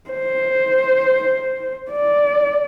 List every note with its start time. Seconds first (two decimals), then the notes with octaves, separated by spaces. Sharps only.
0.11 C5
1.92 D5